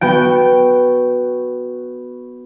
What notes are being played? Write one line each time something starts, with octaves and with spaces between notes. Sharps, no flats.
B3 F#4 G5